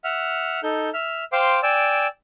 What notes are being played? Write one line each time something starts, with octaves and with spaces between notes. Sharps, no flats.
E5 F#5 F6
D#4 A4 G6
E5 F6
C5 F5 G5 C6 D6
D5 G5 G#5 E6